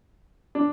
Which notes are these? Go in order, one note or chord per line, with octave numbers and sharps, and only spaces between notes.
D4